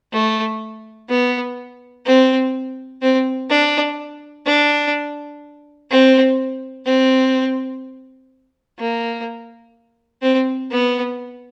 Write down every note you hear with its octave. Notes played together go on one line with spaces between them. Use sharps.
A3
B3
C4
C4
D4
D4
C4
C4
A#3
C4
B3